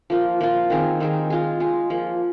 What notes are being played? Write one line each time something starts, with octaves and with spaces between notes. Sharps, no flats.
F3 A#3 F4
F3 A#3 F4
D#3 C4 D#4 G#4
D#3 C4 D#4 G#4
G#3 F4 G#4
G#3 F4 G#4
F3 A#3 G#4